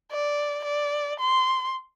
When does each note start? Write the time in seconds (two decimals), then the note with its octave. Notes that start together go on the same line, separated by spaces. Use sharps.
0.11 D5
0.64 D5
1.19 C6